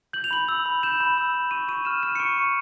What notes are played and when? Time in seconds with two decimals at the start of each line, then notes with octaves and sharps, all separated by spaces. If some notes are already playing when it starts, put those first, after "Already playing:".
0.13 G6 F#7
0.24 F7
0.31 B5 F#7
0.48 E6
0.66 B5
0.83 G6 E7
1.00 B5
1.18 E6
1.34 B5
1.51 C#6 D#7
1.68 C#6 D#7
1.85 F6 E7
2.02 F6 D#7
2.15 C#7
2.20 C#6 D7
2.37 C#6